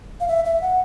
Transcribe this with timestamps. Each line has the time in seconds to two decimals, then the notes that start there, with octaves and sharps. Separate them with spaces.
0.20 F5
0.28 E5
0.45 E5
0.62 F#5